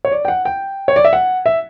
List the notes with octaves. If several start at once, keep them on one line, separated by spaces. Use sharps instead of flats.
C#5
D5
G5
F#5
G5
C#5
D5
E5
F#5
E5